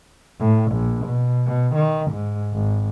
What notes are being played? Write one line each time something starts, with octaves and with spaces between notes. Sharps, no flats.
A2
A#1
B2
B2
D#3
G#2
G#1